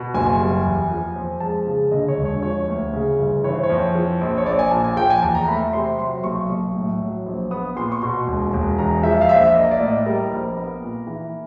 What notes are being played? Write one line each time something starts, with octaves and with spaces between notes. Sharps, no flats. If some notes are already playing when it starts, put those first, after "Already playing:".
Already playing: B2
F#1 G#5
G3
E2
F3
F2
G#3 A5
C#3
D3 D#5
C#5
E1
C#5
F3 C#5
D2
C#3
G1
E3 C#5
C5
C#5
F2
F3
A#1
C#5
A#1 D5
G#5
A#2 A5
G#5
F3 G5
G#5
E2 A5
A#5
A3 B5
C3 C6
F#3 C6
B1 C#6
B1
A2
F#3
A#1
B3 D#6
A#2 C6
C#6
B2 C6
E1
E1
E2 A#5
F3 E5
F5
A#1 E5
A#3 D#5
D5
A2
D#5
G3 A#4
A#1
B3
A#2
E3